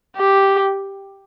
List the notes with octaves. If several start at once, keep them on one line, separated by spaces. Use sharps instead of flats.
G4